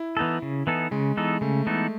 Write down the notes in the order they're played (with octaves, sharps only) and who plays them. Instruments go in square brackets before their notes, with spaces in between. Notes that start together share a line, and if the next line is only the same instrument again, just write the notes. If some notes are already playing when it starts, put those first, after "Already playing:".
Already playing: [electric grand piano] E4
[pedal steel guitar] E3 B3 D#4 A4
C#3
E3 B3 D#4 A4
[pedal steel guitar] C#3 [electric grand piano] G#3
[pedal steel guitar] E3 B3 D#4 A4
[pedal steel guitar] C#3 [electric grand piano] A3
[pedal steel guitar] E3 B3 D#4 A4